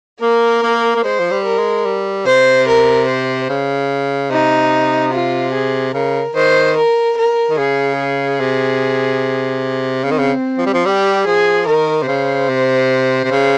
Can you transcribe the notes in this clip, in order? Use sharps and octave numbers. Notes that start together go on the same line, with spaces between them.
A#3 A#4
A#3
A#3
G#3 C5
F3
G3
A#4
G#3
G3
C3 C5
A#4
C5
C#3
C3 D#4
F4
G#4
C#3 A#4
D#3 C5
A#4
A#4
D#3
C#3 G#4
G#4
C3
C#3 C4
D#3
C#3
F3
G3
F3
G3 G4
F3 G#4
D#3 A#4
C3
C#3 C5
C3
C3
C#3